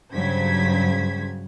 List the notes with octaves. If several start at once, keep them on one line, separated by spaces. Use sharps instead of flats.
G2 C#3 F#3 C5 G#6 B6